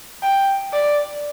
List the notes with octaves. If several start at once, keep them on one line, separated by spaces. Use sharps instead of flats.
G5
D5